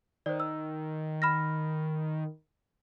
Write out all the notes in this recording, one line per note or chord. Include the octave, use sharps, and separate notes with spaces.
D#3 C5 D5
E6
B5 F6 A#6